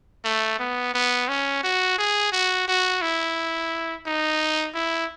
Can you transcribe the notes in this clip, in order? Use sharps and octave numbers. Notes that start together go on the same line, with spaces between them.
A3
B3
B3
C#4
F#4
G#4
F#4
F#4
E4
D#4
E4